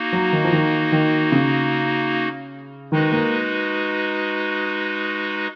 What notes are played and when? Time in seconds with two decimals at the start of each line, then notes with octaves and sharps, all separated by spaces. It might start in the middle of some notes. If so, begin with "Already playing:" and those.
Already playing: A#3 D#4 F#4
0.13 F#3
0.32 D#3
0.44 F3
0.53 D#3
0.92 D#3
1.32 C#3
2.92 D#3 G#3 D#4 F#4 B4
3.12 A#3